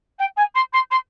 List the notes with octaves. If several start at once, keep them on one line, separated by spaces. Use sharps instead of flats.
G5
G#5
C6
C6
C6